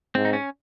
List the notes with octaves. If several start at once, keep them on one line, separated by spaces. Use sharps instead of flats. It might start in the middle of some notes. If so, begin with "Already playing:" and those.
G#2 C4
D#4
C#4